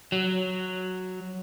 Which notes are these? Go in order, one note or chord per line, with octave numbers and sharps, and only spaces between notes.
F#3